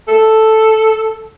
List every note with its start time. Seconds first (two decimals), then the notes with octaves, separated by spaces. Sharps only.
0.08 A4